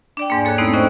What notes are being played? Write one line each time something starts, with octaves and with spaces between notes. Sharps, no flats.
D4 D5 G5
E2 G#2 A#3
A#3 A4 C#5 F#6 G#6
A3 B3 C4 D#4 E4
A2 C#4 C5 D#5 G5 F#6